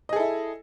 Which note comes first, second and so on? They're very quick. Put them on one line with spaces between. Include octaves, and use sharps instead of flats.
D#5 G#4 A4 E4